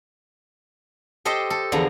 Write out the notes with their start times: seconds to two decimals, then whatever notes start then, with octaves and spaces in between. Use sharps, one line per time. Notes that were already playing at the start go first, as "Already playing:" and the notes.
1.25 G4 A4 C5 D#5 G5
1.50 A4
1.72 E2 D3 F3 A#5